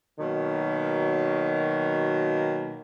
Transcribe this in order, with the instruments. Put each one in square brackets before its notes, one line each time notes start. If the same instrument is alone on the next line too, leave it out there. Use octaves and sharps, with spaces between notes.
[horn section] B2 D#3 F#3 A#3